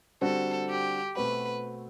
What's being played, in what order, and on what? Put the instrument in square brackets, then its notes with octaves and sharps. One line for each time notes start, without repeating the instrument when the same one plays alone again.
[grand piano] D3 G3 C4 F#4 [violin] A4
[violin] G4
[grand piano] B2 A3 C4 F#4 [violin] B4